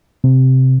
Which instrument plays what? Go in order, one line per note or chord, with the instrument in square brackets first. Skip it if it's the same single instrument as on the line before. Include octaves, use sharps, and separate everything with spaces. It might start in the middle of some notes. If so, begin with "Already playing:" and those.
[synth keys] C3